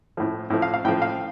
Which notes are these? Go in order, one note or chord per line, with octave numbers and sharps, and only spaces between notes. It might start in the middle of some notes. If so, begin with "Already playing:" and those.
A2 F3
A2 F3
F5
F5
A2 F3 G5
F5